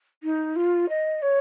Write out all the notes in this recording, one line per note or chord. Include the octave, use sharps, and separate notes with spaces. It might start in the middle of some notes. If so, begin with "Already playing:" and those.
D#4
F4
D#5
C#5